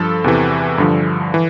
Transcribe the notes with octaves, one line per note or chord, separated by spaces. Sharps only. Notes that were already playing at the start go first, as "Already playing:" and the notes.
Already playing: G2 F3 A4
E2 C3 E3
G2 D3 F3
E3